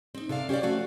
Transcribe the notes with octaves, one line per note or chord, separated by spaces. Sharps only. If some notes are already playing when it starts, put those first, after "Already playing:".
C4 D#4
C3 A4 D5 F5
C#4 G4 A#4 C#5 D5
F3 A3 F#4 F5